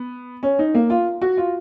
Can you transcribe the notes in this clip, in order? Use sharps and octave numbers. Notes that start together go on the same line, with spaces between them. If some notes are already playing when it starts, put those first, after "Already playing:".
Already playing: B3
C#4
D#4
A#3
F4
F#4
F4